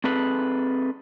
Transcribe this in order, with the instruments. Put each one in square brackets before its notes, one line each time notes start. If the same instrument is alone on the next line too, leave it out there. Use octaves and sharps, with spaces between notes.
[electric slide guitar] C4 G#4 A4 B4